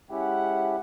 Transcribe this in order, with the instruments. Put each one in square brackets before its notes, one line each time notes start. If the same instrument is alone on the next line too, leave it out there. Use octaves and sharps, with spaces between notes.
[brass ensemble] G#3 E5 F#5 [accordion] C#4 E4 G4